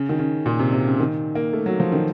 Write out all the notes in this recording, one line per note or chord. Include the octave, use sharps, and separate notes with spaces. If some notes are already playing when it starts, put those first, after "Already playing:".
Already playing: C#3
D#3
C#3
A#2
C3
C3
C#3
D#3
A#3
A3
F#3
F3
D#3